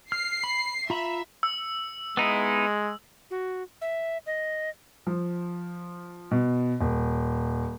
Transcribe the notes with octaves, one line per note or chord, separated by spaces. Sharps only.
F6 C7
B5
F4 E5 A#5 B5
E6
G#3 B3 D#4 E4
F#4
E5
D#5
F3
B2
D#1